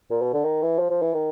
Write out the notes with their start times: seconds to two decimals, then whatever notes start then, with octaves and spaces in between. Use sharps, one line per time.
0.10 A#2
0.22 B2
0.33 D3
0.44 D#3
0.62 E3
0.79 F3
0.90 F3
1.02 E3
1.14 D#3